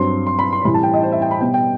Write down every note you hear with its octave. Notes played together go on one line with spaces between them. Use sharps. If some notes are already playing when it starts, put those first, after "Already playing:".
Already playing: G2 F#3 C4 C6
C6
B5
C6
A2 E3 G3 C4 B5
A5
G5
D#5
C5
E5
G5
B5
B2 G3 B3 G5
G5